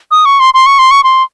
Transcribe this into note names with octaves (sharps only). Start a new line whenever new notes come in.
D#6
C#6
C6
C6
C#6
C6
C#6
C6